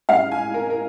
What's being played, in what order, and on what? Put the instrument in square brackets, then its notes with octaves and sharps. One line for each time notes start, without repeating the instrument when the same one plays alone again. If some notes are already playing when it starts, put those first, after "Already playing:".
[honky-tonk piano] G#2 G3 C#4 F5
G#5
A#4
A#4